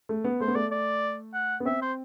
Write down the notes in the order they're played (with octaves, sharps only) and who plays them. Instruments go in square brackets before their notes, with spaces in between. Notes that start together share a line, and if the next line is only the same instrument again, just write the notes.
[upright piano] A3
B3
[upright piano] A3 [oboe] C5
[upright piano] B3
[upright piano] A3 [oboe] D5
[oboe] D5
F#5
[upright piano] B3
[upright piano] C4 [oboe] E5
[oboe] C5